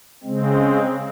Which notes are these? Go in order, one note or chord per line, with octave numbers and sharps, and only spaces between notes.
C#3 G#3 C4